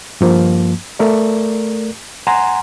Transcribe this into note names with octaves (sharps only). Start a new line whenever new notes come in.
G2 F3 A#3
A3 A#4 D5
F#5 G#5 A#5 C6